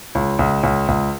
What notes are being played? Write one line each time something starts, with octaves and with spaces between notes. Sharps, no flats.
C#2
C#2
C#2
C#2